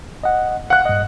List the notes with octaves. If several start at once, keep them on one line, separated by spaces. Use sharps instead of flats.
D#5 F#5
F5 F#5 F#6
G2 D#5